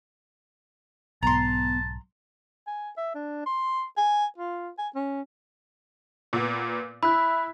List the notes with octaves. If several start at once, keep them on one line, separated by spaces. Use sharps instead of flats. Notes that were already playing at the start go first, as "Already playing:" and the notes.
B1 G#2 B3 A5 A#5 C6
G#5
E5
D4
C6
G#5
F4
G#5
C#4
A#2 B3
E4 B5 F#6